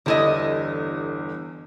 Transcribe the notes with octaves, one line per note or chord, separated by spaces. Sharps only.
G1 E2 D3 G3 E4 D#5